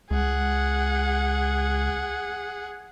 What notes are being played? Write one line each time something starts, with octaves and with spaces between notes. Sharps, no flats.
C#2 G#4 F#5